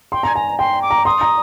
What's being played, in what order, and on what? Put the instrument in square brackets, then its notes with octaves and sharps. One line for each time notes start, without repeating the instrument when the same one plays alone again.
[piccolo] G5 [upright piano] C6
[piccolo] G#5 [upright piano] A#5
[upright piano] G#5 [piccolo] A#5
[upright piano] G5 [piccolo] C6
[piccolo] D6
[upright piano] A#5
[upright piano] C6 [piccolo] D#6
[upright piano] A#5